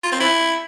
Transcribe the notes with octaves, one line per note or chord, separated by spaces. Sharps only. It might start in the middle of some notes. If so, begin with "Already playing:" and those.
F4
C4
E4